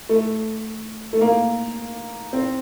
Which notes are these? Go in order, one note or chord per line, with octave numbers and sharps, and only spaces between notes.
A3
A3
A#3
C4